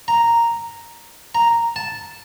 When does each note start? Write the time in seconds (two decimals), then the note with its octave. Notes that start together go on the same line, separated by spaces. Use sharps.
0.08 A#5
1.35 A#5
1.76 A5